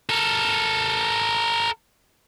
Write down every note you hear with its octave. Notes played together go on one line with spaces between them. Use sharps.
A4 A#4